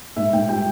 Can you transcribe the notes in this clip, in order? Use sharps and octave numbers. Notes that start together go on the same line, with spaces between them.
G#2 E5
G#2 G5
G3 G5